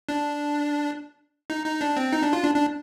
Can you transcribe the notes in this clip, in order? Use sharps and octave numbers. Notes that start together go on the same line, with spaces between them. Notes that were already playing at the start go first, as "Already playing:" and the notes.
D4
D#4
D#4
D4
C4
D#4
D4
F4
D4
D4